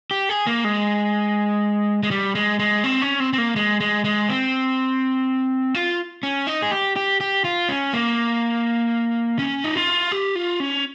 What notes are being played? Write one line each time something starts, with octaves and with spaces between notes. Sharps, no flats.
G4
G#4
A#3
G#3
G#3
G3
G#3
G#3
C4
C#4
C4
C4
A#3
G#3
G#3
G#3
C4
F4
C#4
D#4
G#4
G4
G4
G4
F4
C#4
A#3
C#4
D#4
F4
G4
F4
C#4